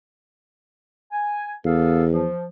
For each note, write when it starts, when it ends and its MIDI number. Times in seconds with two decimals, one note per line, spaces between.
1.12 1.52 80
1.65 2.27 40
1.65 2.03 59
1.65 2.03 69
1.65 2.03 77
2.12 2.44 53